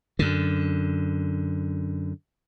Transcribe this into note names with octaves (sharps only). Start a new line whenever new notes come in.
F#2 D3